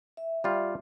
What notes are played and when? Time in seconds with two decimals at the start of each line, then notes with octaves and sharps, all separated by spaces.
0.17 E5
0.44 G3 F4